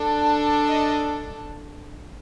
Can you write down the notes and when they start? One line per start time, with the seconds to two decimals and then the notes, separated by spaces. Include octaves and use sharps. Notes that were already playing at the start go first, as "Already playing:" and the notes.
Already playing: D4 A4
0.68 D#5